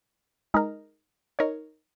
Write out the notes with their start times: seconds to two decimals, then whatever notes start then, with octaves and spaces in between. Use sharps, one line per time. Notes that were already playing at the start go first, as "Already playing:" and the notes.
0.54 G#3 D#4 A#4
1.39 D#4 A#4 C#5